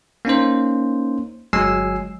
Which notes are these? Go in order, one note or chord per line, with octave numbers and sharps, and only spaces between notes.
A#3 C#4 D#4 C5
G1 F#3 G#3 G#5 E6 C7